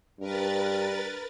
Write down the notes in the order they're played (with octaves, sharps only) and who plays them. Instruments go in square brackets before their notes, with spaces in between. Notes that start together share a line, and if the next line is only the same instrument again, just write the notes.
[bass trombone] G2 [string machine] A#4 B4 A6